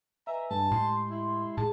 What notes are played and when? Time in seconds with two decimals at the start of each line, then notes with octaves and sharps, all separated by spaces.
0.27 B4 D#5 E5 G#5 A#5
0.51 G2 A5
0.72 A2 G#3 G4 D#5 C6
1.10 E4
1.58 A2 G#4 A5